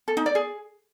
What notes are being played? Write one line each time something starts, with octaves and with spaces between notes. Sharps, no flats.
A4
D#4
D5
G#4